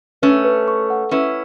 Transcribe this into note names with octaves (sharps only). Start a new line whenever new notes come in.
A3 C#4 B4
B4
C#6
F#5
C#4 E4 B4